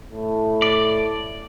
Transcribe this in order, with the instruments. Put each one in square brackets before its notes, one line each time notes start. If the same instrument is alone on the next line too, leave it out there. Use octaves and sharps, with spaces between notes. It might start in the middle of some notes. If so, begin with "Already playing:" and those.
[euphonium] A2
[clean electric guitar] D5